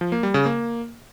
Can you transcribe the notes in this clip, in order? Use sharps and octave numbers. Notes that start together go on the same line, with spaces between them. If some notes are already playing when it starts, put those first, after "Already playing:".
F3
A#3
G3
C#3
A#3